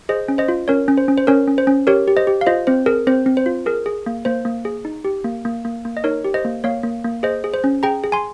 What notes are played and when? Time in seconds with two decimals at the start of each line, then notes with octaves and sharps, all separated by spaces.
0.09 G#4 C5 D#5
0.28 C#4
0.38 C5 D#5
0.48 F4
0.68 C#4 A#4 C#5
0.88 C#4
0.98 C5
1.08 C#4
1.18 C5
1.27 C#4 A#4 C#5
1.48 C#4
1.58 C5
1.67 C#4
1.87 G4 A#4 C#5
2.08 G4
2.17 C5 D#5
2.27 G4
2.41 F5
2.46 F4 C5 D#5
2.67 C4 C5
2.86 G#4 A#4
3.07 C4 C5
3.26 C4
3.37 C5
3.46 F4
3.66 G#4 A#4
3.86 G#4
4.06 A#3
4.25 A#3 C5
4.45 A#3
4.65 G#4
4.85 D#4
5.05 G4
5.24 A#3
5.45 A#3
5.65 A#3
5.85 A#3
5.97 D#5
6.04 D#4 A#4 C#5
6.24 G4
6.34 C5 D#5
6.45 A#3
6.64 A#3 C#5 F5
6.83 A#3
7.04 A#3
7.23 G#4 C5 D#5
7.44 G#4
7.54 C5
7.64 C#4
7.83 G#4 G5 A#5
8.04 G#4
8.12 G#5 C6